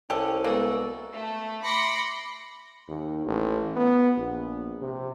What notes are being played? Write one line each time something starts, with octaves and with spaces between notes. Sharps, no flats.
C2 C#4 D4 G4 A4
G#3 A#3 B3 F#4 A4
A3
B5 C6 D6 A#6 C#7
D#2
A1
B3
A#1
C3